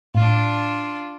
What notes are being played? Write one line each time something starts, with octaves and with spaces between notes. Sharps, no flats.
A2 D4 F4